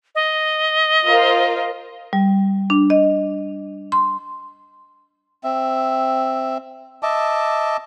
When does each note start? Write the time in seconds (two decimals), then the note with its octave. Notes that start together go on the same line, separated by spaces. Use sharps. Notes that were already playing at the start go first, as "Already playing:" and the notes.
0.15 D#5
1.06 F4 A#4 C5
2.13 G3
2.70 D4
2.90 D#5
3.92 C6
5.44 C4 E5
7.03 D#5 E5 A5 D6